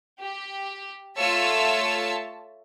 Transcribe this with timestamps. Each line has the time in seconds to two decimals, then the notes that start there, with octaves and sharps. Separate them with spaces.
0.19 G4
1.17 A3 F4 C#5 E5 A5 E6